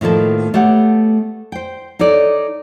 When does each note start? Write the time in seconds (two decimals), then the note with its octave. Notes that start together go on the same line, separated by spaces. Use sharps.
0.01 A2 D#3 F3 A#3 A4 A5
0.54 A3 B3 G4 C#5 F#5
1.52 C5 G5
1.99 D#4 A4 C#5 D5